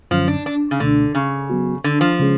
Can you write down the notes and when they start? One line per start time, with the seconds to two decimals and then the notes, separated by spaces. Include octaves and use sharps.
0.11 F#2 D3 F3 F#3 C#4
0.28 D4
0.46 D4
0.71 C#3
0.80 C#2 B2 D3 A3 D4
1.15 C#3
1.50 F#3 B3 F#4
1.84 D3
2.01 F3
2.19 C#3 G#3 C#4 G#4